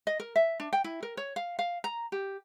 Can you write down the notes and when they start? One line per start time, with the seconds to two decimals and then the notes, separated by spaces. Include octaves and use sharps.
0.07 D#5
0.20 A#4
0.36 E5
0.60 D4
0.73 G5
0.84 E4
1.03 A#4
1.17 C#5
1.36 F5
1.59 F5
1.84 A#5
2.12 G4